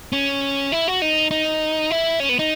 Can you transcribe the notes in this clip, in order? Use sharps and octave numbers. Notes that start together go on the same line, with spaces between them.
C#4
E4
F#4
D#4
D#4
E4
C#4
B3
D#4